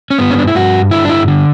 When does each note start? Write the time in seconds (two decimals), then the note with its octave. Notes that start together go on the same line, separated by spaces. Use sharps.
0.11 C#4
0.19 G2 B3
0.31 C#4
0.38 D4
0.47 E4
0.55 G2 F#4
0.91 D3 E4
1.05 D4
1.09 E4
1.28 D3